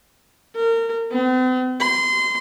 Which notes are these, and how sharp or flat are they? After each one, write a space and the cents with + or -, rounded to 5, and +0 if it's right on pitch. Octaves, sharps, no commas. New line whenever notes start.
A#4 -30
C4 -45
C6 -25